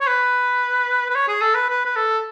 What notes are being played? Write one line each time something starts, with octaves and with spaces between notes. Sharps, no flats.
C#5
B4
B4
C#5
G#4
A4
B4
B4
B4
A4